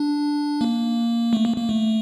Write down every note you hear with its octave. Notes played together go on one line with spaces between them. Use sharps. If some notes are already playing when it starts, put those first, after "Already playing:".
Already playing: D4
A#3
A3
A#3
A#3
A3